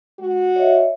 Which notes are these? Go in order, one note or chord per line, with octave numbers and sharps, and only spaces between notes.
G#3 F#4
C#5 D#5 E5